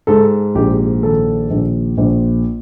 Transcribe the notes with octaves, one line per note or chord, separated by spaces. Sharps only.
G#2 A4
A#1 G4
D#3 A4
A#1
A#1